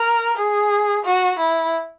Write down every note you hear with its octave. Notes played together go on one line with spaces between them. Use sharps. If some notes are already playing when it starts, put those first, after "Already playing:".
Already playing: A#4
G#4
F#4
E4